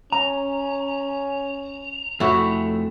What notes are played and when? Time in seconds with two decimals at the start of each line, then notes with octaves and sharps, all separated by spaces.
0.12 C#4 A#5
2.20 F2 A3 E4 F#4